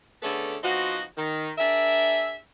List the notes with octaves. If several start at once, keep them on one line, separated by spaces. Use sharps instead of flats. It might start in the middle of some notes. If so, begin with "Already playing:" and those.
D3 A3 B3 C#4 G#4 A4
F3 B3 C4 D#4 F#4
D#3
D4 G#4 A#4 E5